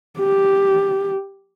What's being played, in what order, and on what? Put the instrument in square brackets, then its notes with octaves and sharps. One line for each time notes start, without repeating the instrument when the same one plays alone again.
[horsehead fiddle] G4